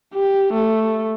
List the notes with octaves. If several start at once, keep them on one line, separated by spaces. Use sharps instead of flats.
G4
A3